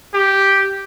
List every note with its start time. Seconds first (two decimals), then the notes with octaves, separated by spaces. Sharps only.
0.14 G4